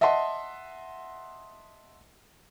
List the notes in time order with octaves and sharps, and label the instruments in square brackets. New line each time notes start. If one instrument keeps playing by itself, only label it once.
[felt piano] D#5 E5 F#5 A5 C6